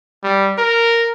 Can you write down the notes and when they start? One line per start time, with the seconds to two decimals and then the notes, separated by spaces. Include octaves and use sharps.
0.23 G3
0.58 A#4